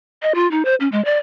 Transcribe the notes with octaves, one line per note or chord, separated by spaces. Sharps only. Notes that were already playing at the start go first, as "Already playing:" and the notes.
D#5
F4
D#4
C5
C#4
G#3
D5